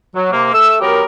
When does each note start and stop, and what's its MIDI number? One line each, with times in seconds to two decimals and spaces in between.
0.14 0.28 54
0.31 0.53 48
0.31 0.53 58
0.53 0.76 57
0.53 0.76 76
0.53 0.76 88
0.81 1.03 54
0.81 1.03 59
0.81 1.03 67
0.81 1.03 70